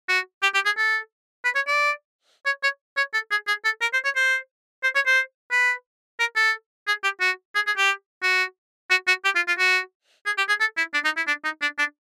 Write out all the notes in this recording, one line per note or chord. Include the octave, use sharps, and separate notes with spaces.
F#4
G4
G4
G#4
A4
B4
C#5
D5
C#5
C#5
C#5
A4
G#4
G#4
A4
A#4
C5
C#5
C5
C5
C#5
C5
B4
A#4
A4
G#4
G4
F#4
G#4
G#4
G4
F#4
F#4
F#4
G4
F4
F4
F#4
G#4
G4
G#4
A4
E4
D4
D#4
E4
D4
D#4
D4
D4